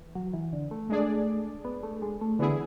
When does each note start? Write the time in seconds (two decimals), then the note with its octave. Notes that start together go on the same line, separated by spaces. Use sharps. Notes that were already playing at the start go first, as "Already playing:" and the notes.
Already playing: E3
0.15 F#3
0.33 E3
0.53 D3
0.71 A3
0.89 G#3 D4 G#4 D5
1.65 B3
1.83 A3
2.02 G#3
2.21 A3
2.39 D3 E3 B3 E4 G#4